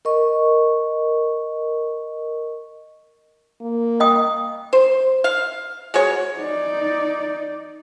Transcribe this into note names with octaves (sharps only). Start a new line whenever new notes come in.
A#4 D#5 C#6
A#3
D#5 G5 D#6
C5
F5
G#3 F#4 C#5
D#4 D5